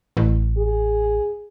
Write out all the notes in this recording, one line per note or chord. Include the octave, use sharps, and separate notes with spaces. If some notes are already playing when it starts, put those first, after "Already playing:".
A1
G#4